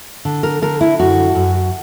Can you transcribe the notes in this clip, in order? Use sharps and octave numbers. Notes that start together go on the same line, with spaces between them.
D3
A#4
D3 A#4
E4
F#2 F#4
F#2